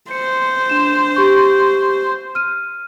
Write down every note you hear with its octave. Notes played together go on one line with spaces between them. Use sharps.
C5 C#7
D4 E7
G4 C#6
F6 D#7